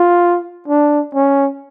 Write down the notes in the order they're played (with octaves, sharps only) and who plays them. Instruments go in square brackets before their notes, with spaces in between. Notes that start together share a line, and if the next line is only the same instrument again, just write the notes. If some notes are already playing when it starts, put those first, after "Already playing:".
Already playing: [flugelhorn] F4
D4
C#4